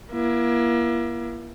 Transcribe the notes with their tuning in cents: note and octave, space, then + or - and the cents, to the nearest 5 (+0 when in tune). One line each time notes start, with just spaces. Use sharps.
A#3 +40 E4 +35